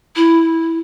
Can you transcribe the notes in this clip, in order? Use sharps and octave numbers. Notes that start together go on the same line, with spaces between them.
E4